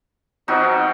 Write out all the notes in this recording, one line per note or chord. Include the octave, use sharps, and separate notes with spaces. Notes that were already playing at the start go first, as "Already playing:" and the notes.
B2 F3 C4 D#4 F#4